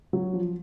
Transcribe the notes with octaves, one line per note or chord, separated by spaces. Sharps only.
F#3
F3